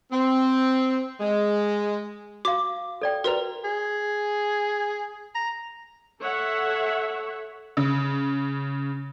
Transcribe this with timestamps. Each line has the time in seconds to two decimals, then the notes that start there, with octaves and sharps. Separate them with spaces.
0.12 C4
1.20 G#3
2.45 F#4 F5 D6
3.02 A4 D5 G5
3.24 F#4 A#4 B4 D5 A#5
3.64 G#4
5.35 A#5
6.21 A4 C#5 E5 F#5
7.77 C#3